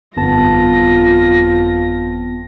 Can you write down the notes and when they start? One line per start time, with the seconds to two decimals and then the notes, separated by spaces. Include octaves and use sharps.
0.17 G1 F2 B3 F4 A5 A#6